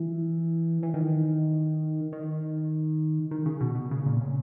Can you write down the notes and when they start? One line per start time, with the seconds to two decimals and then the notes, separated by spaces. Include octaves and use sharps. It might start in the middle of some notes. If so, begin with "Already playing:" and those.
Already playing: E3
0.83 E3
0.94 D#3
2.12 D#3
3.31 D#3
3.46 C#3
3.61 B2
3.75 B2
3.91 C#3
4.06 A#2
4.21 C#3